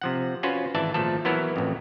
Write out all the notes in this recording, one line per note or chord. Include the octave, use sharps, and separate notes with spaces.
C3 F3 F#5
C#4 F4 F#4 B4 C5
G#1 E3 D5 E5 A5
G#1 A#2 F3 A3 A4
E3 F#3 B3 E4 A#4 C#5
A1 F2